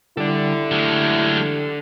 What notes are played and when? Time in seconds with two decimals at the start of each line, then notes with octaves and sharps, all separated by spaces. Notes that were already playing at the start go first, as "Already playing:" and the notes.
0.17 D3 G3 E4 A4 D5
0.71 F#3 G#3 A3 G4 F6